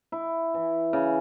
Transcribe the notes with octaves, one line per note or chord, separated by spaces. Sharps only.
E4
E3
C#3